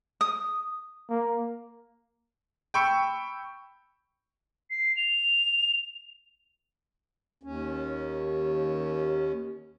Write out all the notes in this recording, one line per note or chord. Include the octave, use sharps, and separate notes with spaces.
D#6
A#3
G5 B5 C#6 E6 C#7
C7
F7
D#2 C#4